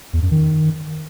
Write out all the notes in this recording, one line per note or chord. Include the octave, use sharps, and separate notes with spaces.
E2
F#2
D#3